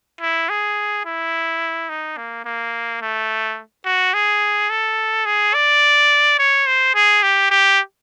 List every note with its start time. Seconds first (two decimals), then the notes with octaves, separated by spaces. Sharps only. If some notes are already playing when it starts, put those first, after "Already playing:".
0.21 E4
0.49 G#4
1.06 E4
1.89 D#4
2.17 A#3
2.45 A#3
3.01 A3
3.85 F#4
4.14 G#4
4.70 A4
5.26 G#4
5.54 D5
6.39 C#5
6.67 C5
6.95 G#4
7.23 G4
7.50 G4